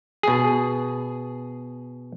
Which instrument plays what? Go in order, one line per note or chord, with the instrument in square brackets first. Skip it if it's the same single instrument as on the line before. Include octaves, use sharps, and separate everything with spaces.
[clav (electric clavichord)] B2 G#4